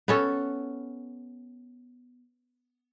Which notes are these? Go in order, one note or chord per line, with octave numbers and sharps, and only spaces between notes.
B3 C#4 A4